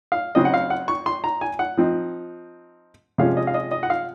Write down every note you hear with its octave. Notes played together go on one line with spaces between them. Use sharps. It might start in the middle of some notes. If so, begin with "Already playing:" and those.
F5
C#3 F#3 C4 D#4 D#5
F#5
F5
F#5
C#6
C6
A#5
G#5
F#5
F3 C4 D#4
C3 F3 G#3 C#4 F5
D#5
F5
D#5
D#5
F#5
F5